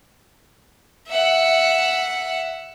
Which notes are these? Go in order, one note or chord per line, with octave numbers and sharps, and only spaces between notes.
E5 F#5